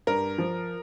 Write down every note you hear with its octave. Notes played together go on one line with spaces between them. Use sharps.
G2 A#4
F3